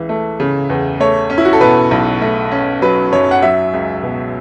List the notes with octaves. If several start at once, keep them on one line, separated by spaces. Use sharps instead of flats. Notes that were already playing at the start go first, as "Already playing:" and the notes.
Already playing: C#2 E3
A3
C#3
E2
A3 C#5
C#4
E4
F#4
A4
B2 B4
B1
A3
C#4
F#3 B4
F#2 C#5
F#5
F#3 E5
C#2
B2